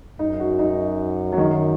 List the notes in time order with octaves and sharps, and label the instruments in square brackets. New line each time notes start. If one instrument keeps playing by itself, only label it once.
[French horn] F#2 [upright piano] D#4
[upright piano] F#4
D#4
F#3
D#3